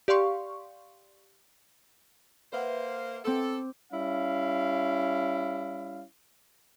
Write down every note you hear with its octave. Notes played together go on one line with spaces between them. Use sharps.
G4 D5 F5 C6 C#6
A#3 B4 C5 E5 F#5
C4 A4 D6
G3 C#4 E4 F5